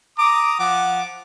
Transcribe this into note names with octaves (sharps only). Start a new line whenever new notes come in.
A#5 D6 D#6
F3 F#5 D6